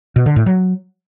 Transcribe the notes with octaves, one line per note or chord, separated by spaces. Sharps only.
B2
D3
A2
F#3